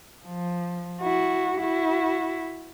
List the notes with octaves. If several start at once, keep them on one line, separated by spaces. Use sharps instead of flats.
F3
E4 F#4
E4 F#4